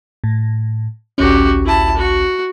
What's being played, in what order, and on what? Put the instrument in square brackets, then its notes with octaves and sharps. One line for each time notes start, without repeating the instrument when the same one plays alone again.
[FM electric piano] A2
[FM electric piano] A1 D2 C#4 [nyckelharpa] F#4 G4
[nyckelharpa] E4 A5
F#4